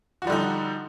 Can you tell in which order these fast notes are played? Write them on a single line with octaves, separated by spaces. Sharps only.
F#4 F3 G3 D3 D#4